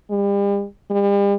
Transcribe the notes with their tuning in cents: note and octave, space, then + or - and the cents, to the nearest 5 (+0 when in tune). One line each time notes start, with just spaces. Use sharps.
G3 +40
G3 +40